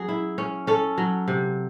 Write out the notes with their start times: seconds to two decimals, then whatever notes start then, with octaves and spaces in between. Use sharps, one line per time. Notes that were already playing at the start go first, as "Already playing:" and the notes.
Already playing: F#3 C#4 G#4
0.08 E4
0.38 C#4
0.67 C#4 A4
0.98 F#3
1.28 C3